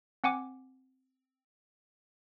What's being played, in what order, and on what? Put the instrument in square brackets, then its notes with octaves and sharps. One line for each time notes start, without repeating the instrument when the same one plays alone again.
[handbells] C4 F#5 G#5 D6